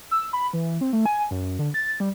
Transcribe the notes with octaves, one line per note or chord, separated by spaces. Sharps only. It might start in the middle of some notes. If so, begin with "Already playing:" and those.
E6
B5
E3
C4
A3
G#5
F#2
D3
A6
G3